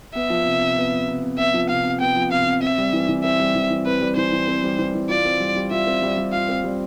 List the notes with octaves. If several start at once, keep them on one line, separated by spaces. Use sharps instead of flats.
B3 E5
F3
C3
C3
B3
F3
C3
C3
B3 E5
F3
C3 F5
C3
B3 G5
F3
C3 F5
C3
C4 E5
G3
E3
E3
C4 E5
G3
E3
E3
C4 B4
G3
E3 C5
E3
C4
G3
E3
E3
F4 D5
C4
G3
G3
F4 E5
C4
G3
G3
F4 F5
C4
G3